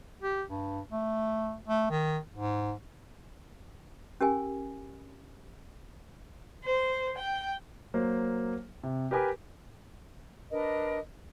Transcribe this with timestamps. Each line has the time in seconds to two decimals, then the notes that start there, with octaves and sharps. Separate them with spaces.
0.22 G4
0.48 G2
0.91 A3
1.67 A3
1.91 D#3
2.34 G#2
4.21 C#4 G4 A#4 G#5
6.64 C5
7.17 G5
7.94 F#3 A#3 C5
8.83 C3
9.11 G4 A#4 B4 G#5 D6
10.51 D4 A#4 B4 D#5